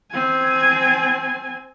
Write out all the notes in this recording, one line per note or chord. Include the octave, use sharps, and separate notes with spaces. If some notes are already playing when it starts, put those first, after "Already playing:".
C4 G#5